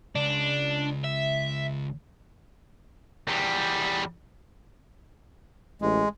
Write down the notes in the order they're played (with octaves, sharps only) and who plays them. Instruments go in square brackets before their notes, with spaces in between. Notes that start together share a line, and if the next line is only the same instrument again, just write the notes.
[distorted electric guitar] C#2 [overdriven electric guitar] D4
[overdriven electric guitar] E5
[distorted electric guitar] E2 G3
[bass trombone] A1 [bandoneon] G#3